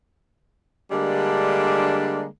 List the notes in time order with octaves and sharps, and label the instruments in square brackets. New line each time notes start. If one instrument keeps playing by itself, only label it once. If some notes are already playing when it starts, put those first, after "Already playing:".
[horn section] D3 G3 G#3 A#3 D4